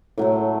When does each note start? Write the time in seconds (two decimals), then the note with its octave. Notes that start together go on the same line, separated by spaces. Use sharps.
0.18 A2 F#3 A3